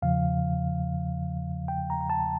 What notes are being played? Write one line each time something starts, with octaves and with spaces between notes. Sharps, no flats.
E2 C#3 F3 F5
G5
A#5
A#5
A5